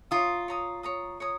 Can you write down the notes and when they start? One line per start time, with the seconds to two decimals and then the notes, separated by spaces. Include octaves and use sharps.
0.11 F4 C#5 A#5 D#6
0.48 C#5 A#5 D#6
0.83 C#5 A#5 D#6
1.20 C#5 A#5 D#6